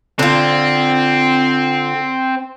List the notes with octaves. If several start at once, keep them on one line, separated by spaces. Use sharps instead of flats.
D3 C4 F4